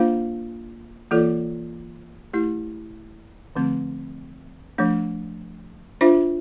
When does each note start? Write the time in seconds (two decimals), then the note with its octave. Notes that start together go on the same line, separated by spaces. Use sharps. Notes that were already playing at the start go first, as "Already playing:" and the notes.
Already playing: A#3 D4 F4 C5 F5
1.11 E3 A#3 F4 A4 D5
2.33 A3 E4 G4
3.56 D3 F3 A3 C4
4.78 F3 A3 D4
6.01 D4 F4 C5 E5